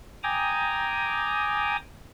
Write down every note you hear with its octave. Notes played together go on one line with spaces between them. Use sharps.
G5 G#5 A#5 D6 D#6